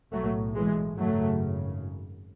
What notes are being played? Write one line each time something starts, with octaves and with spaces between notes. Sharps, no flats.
B1 A2 F#3 A3
E3 G#3
G#1 F#2 C#3 F#3 A3